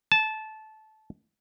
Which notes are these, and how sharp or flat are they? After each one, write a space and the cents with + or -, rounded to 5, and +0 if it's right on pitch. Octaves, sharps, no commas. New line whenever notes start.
A5 -15